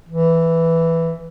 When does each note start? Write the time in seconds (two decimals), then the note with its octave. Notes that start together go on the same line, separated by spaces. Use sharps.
0.09 E3